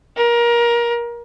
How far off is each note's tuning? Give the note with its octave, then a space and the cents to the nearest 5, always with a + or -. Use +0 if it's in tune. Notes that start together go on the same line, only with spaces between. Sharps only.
A#4 +25